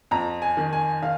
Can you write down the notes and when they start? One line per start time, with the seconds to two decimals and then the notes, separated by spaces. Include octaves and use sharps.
0.11 F2 A#5
0.42 G#5
0.57 D#3
0.73 G#5
1.03 D#3 F5